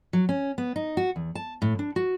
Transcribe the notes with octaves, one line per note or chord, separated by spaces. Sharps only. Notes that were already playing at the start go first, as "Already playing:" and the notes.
F#3
C#4
B3
D#4
F#4
E2
A5
A2
D4
F#4